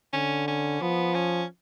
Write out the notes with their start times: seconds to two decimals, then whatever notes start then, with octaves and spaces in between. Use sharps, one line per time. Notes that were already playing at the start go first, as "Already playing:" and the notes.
0.13 D3 C#4
0.48 C#4
0.81 F3 B3
1.14 C#4